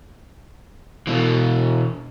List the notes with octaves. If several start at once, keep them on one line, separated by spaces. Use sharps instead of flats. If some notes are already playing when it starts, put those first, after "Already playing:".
B2 E3